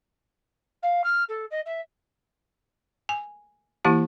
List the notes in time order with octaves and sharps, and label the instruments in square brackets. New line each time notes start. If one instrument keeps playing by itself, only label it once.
[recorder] F5
F6
A4
D#5
E5
[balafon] G#5
E3 A#3 E4 G4 A5